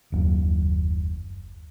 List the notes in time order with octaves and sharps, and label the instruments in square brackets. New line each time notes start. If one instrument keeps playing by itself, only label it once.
[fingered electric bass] F#1 D#2 F#3